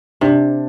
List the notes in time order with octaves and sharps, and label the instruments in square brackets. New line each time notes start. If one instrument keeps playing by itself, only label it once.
[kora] C3 [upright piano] D4